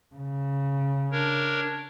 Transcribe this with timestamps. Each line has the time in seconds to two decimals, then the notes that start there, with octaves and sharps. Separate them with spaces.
0.15 C#3
1.12 D4 A#4 C#5